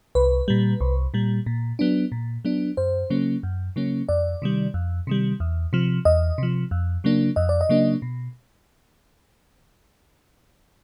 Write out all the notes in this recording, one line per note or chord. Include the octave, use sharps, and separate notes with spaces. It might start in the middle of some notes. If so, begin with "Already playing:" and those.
C2 B4
A#2 G3
C2
A#2 G3
A#2
F#3 B3 D4
A#2
F#3 B3 D4
F#2 C5
C#3 F#3 A#3 C#4
F#2
C#3 F#3 A#3 C#4
F2 D5
C3 D#3 G3
F2
C3 D#3 G3
E2
C3 F3
E2 D#5
C3 F3
F2
C#3 F#3 A#3 D4
F2 D#5
D5
D#5
C#3 F#3 A#3 D4
B2